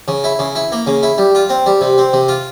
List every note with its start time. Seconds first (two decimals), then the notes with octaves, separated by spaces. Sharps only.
0.08 C#3
0.24 E4
0.39 C#3
0.55 E4
0.72 A#3
0.87 C#3
1.03 E4
1.18 G3
1.35 F4
1.50 C4
1.66 G3
1.81 C3
1.98 C4
2.13 C3
2.28 F4